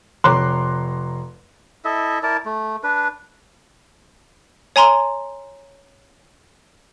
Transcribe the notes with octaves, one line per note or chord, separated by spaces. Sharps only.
F1 C#5 A#5 C6 D6 F#6
E4 A4 D#5 E5
E4 A#4 D5 A5
A3
D4 B4
C#5 G#5 A#5 C6